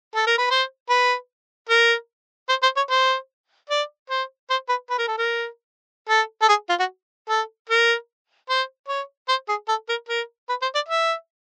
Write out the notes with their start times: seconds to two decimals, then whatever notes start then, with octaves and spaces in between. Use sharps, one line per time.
0.15 A4
0.27 A#4
0.38 B4
0.51 C5
0.89 B4
1.70 A#4
2.49 C5
2.63 C5
2.77 C#5
2.90 C5
3.70 D5
4.10 C5
4.50 C5
4.69 B4
4.90 B4
4.99 A#4
5.08 A4
5.18 A#4
6.09 A4
6.42 A4
6.49 G#4
6.70 F4
6.80 F#4
7.29 A4
7.70 A#4
8.50 C5
8.89 C#5
9.29 C5
9.49 G#4
9.68 A4
9.89 A#4
10.09 A#4
10.49 B4
10.62 C5
10.75 D5
10.89 E5